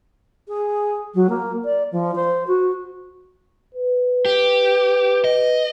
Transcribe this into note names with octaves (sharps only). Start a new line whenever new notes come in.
G#4
F#3
A#3
D5
F3
C5
F#4
B4
G4
D#5